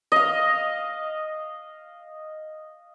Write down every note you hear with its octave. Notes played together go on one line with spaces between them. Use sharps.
D#5 F5